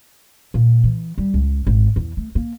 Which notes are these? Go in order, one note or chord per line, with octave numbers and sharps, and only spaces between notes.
A#2
E3
G3
C#2
G#1
E2
A3
A#3